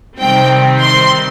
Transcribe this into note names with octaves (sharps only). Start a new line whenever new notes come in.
C3 D#3 G3 C4 G5
C6